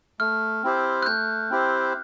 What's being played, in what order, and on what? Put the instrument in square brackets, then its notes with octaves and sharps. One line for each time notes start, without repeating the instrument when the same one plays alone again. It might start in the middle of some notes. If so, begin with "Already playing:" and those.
[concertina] A3 [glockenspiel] F6
[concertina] C4 E4 G4 C5
[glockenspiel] F#6
[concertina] A3 [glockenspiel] G6
[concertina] C4 E4 G4 C5